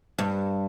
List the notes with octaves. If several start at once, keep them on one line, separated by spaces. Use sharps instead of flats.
G2